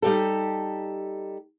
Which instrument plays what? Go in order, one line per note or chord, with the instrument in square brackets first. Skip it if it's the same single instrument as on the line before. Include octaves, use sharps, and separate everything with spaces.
[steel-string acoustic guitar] G3 D#4 G4 A4